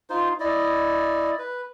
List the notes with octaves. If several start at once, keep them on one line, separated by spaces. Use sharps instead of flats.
D#4 F4 C5
E4 D5 D#5
B4